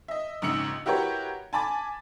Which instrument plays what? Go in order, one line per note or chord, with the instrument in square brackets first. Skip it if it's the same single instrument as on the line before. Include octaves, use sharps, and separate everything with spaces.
[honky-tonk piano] D#5 E5
A#1 G#2 C#3 E6 C#7 F#7
E4 F#4 G4 A#4 B4 C#5
G#5 A5 B5 D6 A6